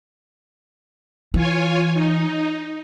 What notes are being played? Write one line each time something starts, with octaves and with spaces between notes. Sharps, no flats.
E3 F4 C#5 G#5
D#4